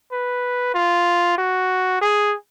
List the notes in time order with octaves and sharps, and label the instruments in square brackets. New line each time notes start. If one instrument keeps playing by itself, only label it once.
[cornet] B4
F4
F#4
G#4